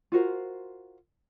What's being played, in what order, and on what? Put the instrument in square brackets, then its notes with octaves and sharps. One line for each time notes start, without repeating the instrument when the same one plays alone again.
[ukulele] F4 F#4 A#4 C5